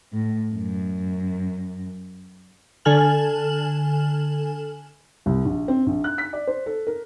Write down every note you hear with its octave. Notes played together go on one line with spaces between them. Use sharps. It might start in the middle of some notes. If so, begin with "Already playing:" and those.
A2
F#2
D3 A4 G#5 F6 F#7
C2
A#1
C4
A#1
F#6
B6
D5
C5
A4
A#4